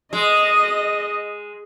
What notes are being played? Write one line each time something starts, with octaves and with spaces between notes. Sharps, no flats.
G#3 D#5